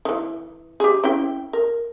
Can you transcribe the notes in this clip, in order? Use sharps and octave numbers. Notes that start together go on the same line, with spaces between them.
D#3 E3
G4 G#4
C#4 E4 G5
A#4